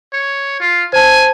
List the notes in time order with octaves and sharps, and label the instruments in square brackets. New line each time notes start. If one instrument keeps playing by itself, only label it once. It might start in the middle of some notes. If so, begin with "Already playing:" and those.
[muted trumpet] C#5
F4
[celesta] C5 A5 [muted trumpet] G#5